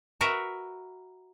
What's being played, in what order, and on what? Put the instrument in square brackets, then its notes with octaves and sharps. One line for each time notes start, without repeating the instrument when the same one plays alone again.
[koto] F#4 A#4 B4 E5 F#5